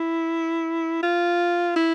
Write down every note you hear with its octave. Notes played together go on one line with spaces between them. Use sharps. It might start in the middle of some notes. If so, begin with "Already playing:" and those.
Already playing: E4
F4
E4